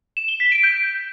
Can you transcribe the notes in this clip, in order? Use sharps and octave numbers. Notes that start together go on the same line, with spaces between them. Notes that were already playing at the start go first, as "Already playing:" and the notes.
E7
G7
B6
D7
G6